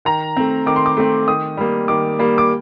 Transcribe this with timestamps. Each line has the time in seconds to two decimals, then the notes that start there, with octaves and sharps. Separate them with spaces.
0.05 D#3 A#5
0.37 A3 C4
0.66 D#3 D6
0.76 C6
0.86 D6
0.97 A3 C4
1.27 D#3 D#6
1.57 G3 A#3
1.88 D#3 D6
2.19 G3 A#3
2.38 D6